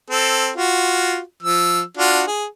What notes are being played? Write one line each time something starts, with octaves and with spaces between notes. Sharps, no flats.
C4 A4
F4 F#4
F3 E6
D4 F4 F#4
G#4